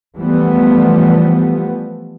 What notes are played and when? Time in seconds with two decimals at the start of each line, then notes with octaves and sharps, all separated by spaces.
0.17 E3 F3 G3 A3 B3